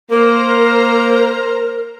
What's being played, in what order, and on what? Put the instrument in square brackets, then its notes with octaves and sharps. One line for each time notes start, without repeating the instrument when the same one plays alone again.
[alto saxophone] A#3 [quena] A#4 [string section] C5 A#5